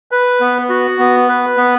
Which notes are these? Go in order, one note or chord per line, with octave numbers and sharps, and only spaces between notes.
B4
B3
F#4
B3
B4
B3